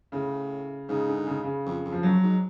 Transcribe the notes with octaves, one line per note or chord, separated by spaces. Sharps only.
A2 C#3
G#2 C#3
D3
C#3
C#3
F2
F2
F3
F#2 F#3
G#2